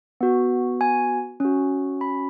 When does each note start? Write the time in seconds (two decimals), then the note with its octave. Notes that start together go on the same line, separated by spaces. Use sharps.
0.21 B3 F#4
0.81 G#5
1.40 C#4 F#4
2.01 B5